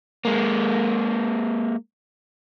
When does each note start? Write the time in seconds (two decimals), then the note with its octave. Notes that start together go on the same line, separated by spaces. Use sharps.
0.25 G#3 A#3